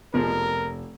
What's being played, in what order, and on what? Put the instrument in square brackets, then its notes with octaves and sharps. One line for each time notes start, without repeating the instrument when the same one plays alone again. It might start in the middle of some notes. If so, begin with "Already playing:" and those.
[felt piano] F1 [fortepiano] B2 F3 G#3 [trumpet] A#4